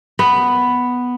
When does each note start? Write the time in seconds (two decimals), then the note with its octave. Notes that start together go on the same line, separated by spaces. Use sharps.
0.19 B3